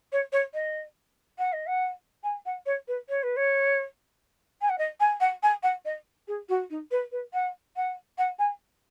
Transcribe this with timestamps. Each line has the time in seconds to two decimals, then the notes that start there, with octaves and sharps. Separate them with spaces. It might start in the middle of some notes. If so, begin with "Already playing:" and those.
0.12 C#5
0.32 C#5
0.54 D#5
1.38 F#5
1.52 D#5
1.66 F#5
2.23 G#5
2.45 F#5
2.66 C#5
2.87 B4
3.09 C#5
3.23 B4
3.36 C#5
4.61 G#5
4.69 F#5
4.78 D#5
5.00 G#5
5.20 F#5
5.43 G#5
5.63 F#5
5.85 D#5
6.27 G#4
6.48 F#4
6.70 D#4
6.91 B4
7.11 B4
7.33 F#5
7.76 F#5
8.18 F#5
8.38 G#5